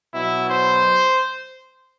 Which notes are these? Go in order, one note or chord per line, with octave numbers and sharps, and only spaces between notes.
B2 F#3 E4
C5